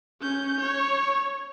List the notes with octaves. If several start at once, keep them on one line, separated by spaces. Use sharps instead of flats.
C#4 G6
C#5